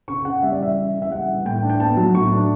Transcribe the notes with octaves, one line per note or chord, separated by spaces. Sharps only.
C#3 C#6
C#3 F#5
G3 E5
D5
E3 E5
C#3
C#3
E5
G3 F#5
E3
A2 G5
D4
G5
B3 A5
F#3
A2 C#6
D4